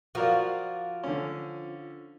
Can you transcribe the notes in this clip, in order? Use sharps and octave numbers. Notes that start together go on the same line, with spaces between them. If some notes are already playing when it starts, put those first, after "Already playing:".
F3 F#4 A#4 D5
D3 C#4